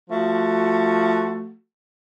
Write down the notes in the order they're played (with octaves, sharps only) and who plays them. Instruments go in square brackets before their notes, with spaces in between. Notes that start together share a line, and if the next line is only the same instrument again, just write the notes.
[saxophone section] F3 A3 F#4